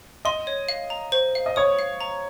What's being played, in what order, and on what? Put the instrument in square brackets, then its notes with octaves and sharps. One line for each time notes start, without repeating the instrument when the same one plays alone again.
[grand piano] D#5 [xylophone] C6
[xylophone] C#5
F5
A#5
C5
F5
[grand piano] D#5
[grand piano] C#5 [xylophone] D#6
[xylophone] F5
A#5